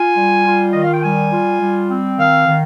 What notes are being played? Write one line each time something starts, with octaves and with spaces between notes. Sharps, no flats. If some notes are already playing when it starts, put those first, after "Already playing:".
Already playing: F4 G#5
G3
F4
D#3 D#5
F5
G5
G3 G#5
F4
G3
C4
D#3 F5
D#3